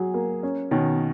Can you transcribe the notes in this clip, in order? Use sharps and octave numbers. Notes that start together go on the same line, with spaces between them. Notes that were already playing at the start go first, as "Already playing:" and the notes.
Already playing: F#3 G#4
A#3
C#4
B2 D#3 C#4